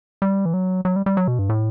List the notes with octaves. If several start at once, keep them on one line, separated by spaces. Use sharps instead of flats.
G3
E3
F#3
F#3
G3
G3
F#3
B2
G2
A2